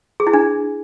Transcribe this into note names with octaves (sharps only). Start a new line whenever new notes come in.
G#4
E4
D4